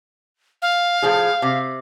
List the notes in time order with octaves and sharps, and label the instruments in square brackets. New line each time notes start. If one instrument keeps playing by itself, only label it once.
[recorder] F5
[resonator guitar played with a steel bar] A2 F3 G#4
C3